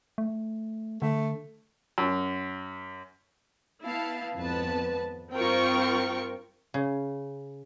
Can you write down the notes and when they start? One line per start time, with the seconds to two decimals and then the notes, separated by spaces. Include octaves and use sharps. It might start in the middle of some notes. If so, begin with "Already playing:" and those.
0.18 A3
1.02 D3 A3
1.98 F#2
3.83 B3 E4 F5 A5
4.36 G#1 F2 B3 B4 A5
5.34 G2 C4 F4 A#4 G5 C#6
6.74 C#3